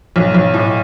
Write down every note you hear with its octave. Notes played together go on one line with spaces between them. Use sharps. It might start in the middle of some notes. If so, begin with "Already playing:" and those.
B1
B1
A2